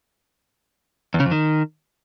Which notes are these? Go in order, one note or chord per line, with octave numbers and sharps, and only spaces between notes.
E2
C#3
F2
D#3